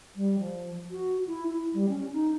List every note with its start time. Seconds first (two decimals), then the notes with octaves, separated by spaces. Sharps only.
0.16 G3
0.39 F3
0.91 F#4
1.27 E4
1.47 E4
1.73 G3
1.89 C#4
2.13 D#4